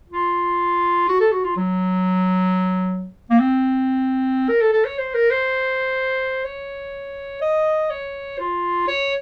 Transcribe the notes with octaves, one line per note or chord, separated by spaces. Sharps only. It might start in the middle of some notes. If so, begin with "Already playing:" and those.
F4
F#4
A4
F#4
F4
F#3
A#3
C4
A#4
A4
A4
C#5
C5
A#4
C5
C#5
D#5
C#5
F4
C#5